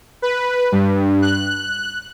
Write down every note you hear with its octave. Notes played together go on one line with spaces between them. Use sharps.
B4
G2
F#6